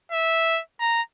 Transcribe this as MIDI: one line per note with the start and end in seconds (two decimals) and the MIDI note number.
0.12 0.61 76
0.81 1.01 82